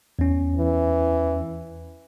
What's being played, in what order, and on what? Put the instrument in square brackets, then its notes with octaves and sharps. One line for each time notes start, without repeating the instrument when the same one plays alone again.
[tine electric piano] E2 C#4
[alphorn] E3